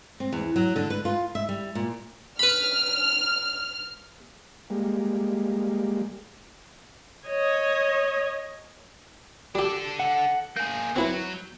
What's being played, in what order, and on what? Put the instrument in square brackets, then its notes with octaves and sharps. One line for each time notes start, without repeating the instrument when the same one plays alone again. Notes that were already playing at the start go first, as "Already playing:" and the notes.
[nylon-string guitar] C4
E2
F#3
D3
B4
F4
E5
G3
A#2
[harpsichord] B4 B5 [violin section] F6
[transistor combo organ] G3 G#3 A#3
[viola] C#5 D#5
[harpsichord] G3 G4 [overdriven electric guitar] D4 A4
[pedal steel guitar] F#5
[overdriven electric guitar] A#3 G#4 [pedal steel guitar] G6
[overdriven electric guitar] F#3 [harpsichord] C4 E4 B4